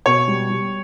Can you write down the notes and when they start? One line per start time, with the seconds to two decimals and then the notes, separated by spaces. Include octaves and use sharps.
0.06 B2 C#5
0.28 G3
0.50 G3